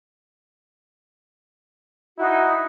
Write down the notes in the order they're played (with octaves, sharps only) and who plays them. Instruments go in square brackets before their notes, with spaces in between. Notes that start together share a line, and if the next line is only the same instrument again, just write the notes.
[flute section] D#4 F#4 [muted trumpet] E4